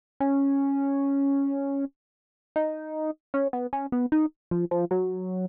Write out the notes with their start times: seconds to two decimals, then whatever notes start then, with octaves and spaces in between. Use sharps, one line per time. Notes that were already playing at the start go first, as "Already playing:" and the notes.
0.20 C#4
2.56 D#4
3.34 C#4
3.53 B3
3.73 C#4
3.92 B3
4.12 D#4
4.51 F3
4.71 F3
4.91 F#3